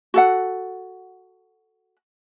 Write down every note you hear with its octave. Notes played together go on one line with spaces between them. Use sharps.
F#4 A4 F#5